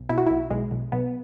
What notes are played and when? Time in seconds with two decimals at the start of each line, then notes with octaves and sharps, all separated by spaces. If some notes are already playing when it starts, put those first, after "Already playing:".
Already playing: B1
0.09 B2 E4
0.18 F#4
0.27 B1 E4
0.50 B1 G#3
0.71 B1
0.92 B1 B3